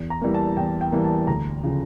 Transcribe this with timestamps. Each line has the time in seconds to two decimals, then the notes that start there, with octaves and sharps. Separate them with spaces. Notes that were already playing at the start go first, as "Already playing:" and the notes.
Already playing: E2
0.10 A#5
0.22 E3 G3 A#3
0.34 A5
0.57 E2 G5
0.81 G5
0.92 E3 G3 A#3
1.04 A5
1.27 D2 A#5
1.63 C#3 F3